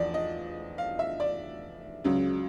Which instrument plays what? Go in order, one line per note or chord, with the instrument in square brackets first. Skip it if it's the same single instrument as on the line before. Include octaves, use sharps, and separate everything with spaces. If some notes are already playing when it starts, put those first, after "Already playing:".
Already playing: [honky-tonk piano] E2 F3 D5
D#5
F5
E5
D5
C#2 C#3 F#3